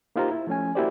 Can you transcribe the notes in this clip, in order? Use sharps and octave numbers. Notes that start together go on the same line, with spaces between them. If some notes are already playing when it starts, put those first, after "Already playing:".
A#3 D#4 F4 G4 C5 A#5
E4
F3 A3 C#4 G#5
A#3 E4 F#4 G4 C5 D5